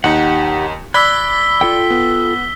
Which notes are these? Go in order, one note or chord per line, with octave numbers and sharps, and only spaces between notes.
D#2 D#4 G4 F#5 C#7
D5 B5 E6 F#6 G#6 B6 G7
F4 A4 G5
B3